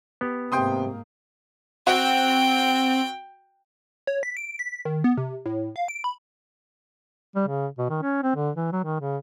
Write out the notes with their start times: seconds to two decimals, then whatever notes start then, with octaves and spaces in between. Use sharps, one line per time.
0.21 B3 G4
0.52 G#2 C3 A#3 G5 C6 D#6
1.87 C4 F#4 G5
4.07 C#5
4.23 B6
4.37 D7
4.59 B6
4.85 D#3
5.04 B3
5.18 C3
5.46 A2
5.76 F5
5.88 D7
6.04 B5
7.35 G3
7.47 C#3
7.78 B2
7.90 D#3
8.02 C#4
8.23 C4
8.36 D3
8.55 E3
8.72 F#3
8.84 D#3
9.00 C#3